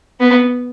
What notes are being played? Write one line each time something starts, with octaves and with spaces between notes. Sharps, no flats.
B3